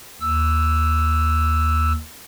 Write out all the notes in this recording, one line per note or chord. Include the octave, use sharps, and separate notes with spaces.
D#2 E6